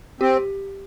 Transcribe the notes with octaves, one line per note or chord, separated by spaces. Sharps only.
C4 G4